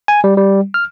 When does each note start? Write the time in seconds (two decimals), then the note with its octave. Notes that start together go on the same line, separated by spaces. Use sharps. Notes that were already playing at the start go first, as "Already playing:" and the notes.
0.08 G#5
0.24 G3
0.37 G3
0.74 F6